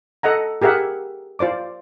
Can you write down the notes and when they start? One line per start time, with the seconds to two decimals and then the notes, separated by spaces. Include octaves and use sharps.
0.23 A4 D#5 F#5 A#5
0.62 G4 G#4 A#4 E5 F#5
1.39 F4 C5 D5 D6